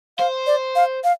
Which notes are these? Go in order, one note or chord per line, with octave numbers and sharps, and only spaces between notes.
C5 F5
D5
F5
F5